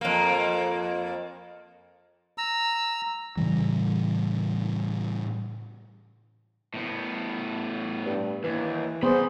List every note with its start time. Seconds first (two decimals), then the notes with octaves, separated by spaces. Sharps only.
0.01 F2 A#3
2.38 A#5 E6
3.37 A2 C#3 E3 G3
6.74 A2 B3
8.05 G2
8.44 D#2 E3
9.03 B3 G#4 C5 B5 C6